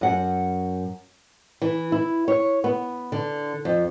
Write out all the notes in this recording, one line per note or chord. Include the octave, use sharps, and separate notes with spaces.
F#2 F#5
E3
E4
C#5
B3
D3
F2